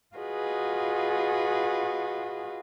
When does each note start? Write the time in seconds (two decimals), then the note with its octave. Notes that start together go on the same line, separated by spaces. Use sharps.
0.16 F4 F#4 G#4 B4 D#5